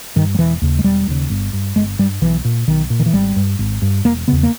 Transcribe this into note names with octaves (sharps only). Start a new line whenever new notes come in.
G2 D#3
G3
E1 E3
D#2 C#3
G#3
E1 G3
D#2 C#3
G1
G2
G1 G#3
G2 G3
B1 E3
A#2
B1 D#3
A#2
D#3
E3
G#1 G3
G2
G#1
G2
E1 A#3
E2 C#3 B3
A#3